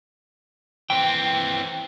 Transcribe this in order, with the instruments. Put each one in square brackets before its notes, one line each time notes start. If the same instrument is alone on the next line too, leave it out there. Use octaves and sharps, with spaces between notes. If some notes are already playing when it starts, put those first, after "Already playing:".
[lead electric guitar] E3 C4 [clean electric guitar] G5